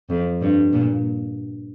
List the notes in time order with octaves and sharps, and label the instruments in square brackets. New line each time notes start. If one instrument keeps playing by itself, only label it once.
[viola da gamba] F2
G2
A#2